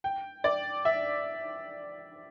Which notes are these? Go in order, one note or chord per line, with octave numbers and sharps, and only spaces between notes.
G5
D5
E5